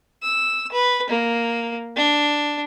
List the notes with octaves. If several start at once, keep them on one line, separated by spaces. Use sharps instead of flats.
E6
B4
A#3
D4